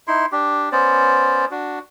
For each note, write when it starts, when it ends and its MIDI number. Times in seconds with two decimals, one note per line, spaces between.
0.08 0.26 63
0.08 0.26 64
0.08 0.26 84
0.32 0.69 62
0.32 0.69 67
0.72 1.45 59
0.72 1.45 61
0.72 1.45 72
0.72 1.45 74
1.51 1.79 62
1.51 1.79 66